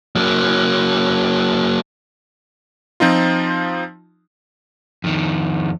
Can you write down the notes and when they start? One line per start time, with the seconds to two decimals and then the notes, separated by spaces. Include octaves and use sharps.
0.16 F#3 A#3
3.00 F3 C4 D#4 F4
5.04 F2 D#3